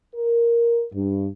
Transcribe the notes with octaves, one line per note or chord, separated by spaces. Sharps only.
A#4
G2